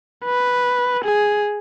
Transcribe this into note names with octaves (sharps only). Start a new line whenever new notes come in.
B4
G#4